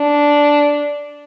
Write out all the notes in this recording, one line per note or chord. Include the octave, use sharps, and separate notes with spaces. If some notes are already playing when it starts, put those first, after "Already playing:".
Already playing: D4